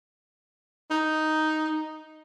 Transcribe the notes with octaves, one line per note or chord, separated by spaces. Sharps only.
D#4